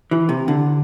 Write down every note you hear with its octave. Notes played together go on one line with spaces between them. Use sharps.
E3
C3
D3